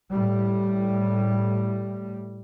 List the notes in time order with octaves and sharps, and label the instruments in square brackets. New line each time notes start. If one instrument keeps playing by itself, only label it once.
[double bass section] A2 G3